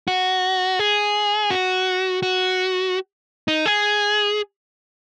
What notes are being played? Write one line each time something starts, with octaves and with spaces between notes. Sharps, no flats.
F#4
G#4
F#4
F#4
D#4
G#4